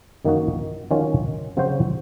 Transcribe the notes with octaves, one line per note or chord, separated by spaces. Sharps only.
F#2 D#3 A#3 D#4 F#4
D#3 F#3 C#4 F4
C#3 F#3 C4 F#4 C5